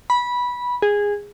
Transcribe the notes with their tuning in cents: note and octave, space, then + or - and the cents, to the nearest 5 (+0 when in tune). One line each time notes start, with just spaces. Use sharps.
B5 -15
G#4 -15